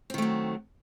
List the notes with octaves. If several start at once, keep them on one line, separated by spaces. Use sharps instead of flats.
D#3 F#3 A3 C4